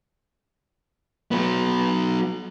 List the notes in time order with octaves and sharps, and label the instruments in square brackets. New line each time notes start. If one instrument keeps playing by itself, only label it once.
[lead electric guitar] F#3 B3